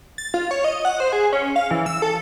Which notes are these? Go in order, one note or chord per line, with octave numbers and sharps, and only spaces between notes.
A6
F4
C#5
D#5
F#5
C5
G#4
C#4
F5
E3
E6
A4